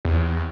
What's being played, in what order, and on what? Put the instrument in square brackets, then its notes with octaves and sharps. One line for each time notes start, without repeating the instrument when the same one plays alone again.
[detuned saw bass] E2